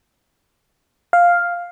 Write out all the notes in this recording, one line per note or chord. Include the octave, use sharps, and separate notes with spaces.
F5